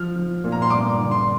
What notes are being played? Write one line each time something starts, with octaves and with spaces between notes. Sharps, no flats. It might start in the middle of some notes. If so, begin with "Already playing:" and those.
Already playing: F3 F6
F3
A#2
A#5
C6
G2 D6
D3
C6